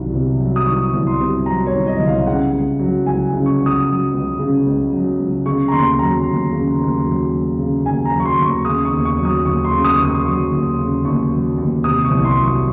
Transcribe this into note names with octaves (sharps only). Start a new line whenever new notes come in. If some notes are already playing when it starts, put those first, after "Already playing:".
Already playing: C2 C3 D#3 F#3
C3
F#3
D#6
D#3 C#6
C2
C6
C3
F#3 A#5
C#5
D#3
D#5
C2
F5
C#3 F#5
C#2
F#3
C#2 G#5
C#3
C#6
C#2
D#6
F#3
C#2
C#3
C#2
F#3
C#2
C#3 C#6
A#5
D#2 C6
F#3 A#5
D#2
C#3
D#2
F#3
D#2
C#3
D#2 G#5
A#5
F#3
C#6
C6
D#2
C#6
C#3 D#6
C#6
D#2
C#6
F#3
D#6
D#2 C#6
C6
C#3
D#6
D#2 C#6
D#6
F#3 C#6
D#2
C#3
D#2 C#6
F#3
D#2
C3 D#6
C#6
C2
C6
F#3
C#6